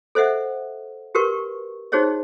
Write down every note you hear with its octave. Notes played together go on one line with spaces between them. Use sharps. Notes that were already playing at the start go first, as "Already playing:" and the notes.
A4 C5 D#5 E5 F#5
F#4 G4 A#4 B4 C#6
D#4 F#4 G#4 C5 C#5 D#5